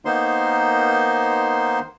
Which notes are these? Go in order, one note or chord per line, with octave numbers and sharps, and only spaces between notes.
D#3 A#3 B3 D#4 C5 C6